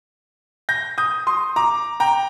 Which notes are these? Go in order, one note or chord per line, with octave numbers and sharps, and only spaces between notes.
G6 A#6
D#6 G6
C6 D#6
A#5 D6
G5 A#5